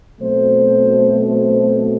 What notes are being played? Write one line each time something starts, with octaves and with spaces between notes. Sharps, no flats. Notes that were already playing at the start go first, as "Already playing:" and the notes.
B2 F#3 A3 C4 C5
C5